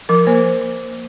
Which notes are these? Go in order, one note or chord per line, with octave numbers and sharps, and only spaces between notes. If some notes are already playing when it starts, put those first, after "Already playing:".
F3 A#4
A#3 C5